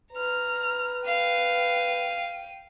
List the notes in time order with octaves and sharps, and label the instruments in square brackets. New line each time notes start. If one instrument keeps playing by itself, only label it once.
[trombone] B4 [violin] A#5 F6
[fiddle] F5 [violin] G5 D#7